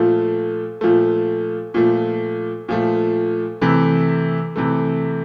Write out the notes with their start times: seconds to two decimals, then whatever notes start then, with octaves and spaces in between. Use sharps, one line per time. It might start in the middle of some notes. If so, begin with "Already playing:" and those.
Already playing: A#2 F3 A3
0.81 A#2 F3 A3
1.74 A#2 F3 A3
2.68 A#2 F3 A3
3.61 C3 E3 A3
4.56 C3 E3 A3